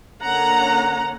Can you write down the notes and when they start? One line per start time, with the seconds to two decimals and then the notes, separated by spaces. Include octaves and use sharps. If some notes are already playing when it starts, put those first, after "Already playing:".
0.22 D3 A#3 C#4 F#5 A#5